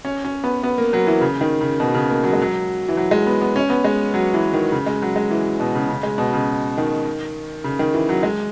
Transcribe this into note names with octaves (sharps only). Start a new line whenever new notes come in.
C#4
C#4
B3
B3
A#3
F#3
E3
C#3
D#3
C#3
B2
C#3
A#3
F#3
G#3
F#3
E3
F#3
G#3
B3
B3
C#4
B3
G#3
F#3
E3
D#3
C#3
G#3
F#3
G#3
E3
B2
C#3
C#3
G#3
B2
C#3
D#3
C#3
D#3
E3
F#3
G#3